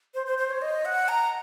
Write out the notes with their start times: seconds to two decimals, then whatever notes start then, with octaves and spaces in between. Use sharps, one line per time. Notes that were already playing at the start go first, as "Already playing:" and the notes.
0.14 C5
0.27 C5
0.38 C5
0.50 C#5
0.62 D#5
0.85 F#5
1.08 A#5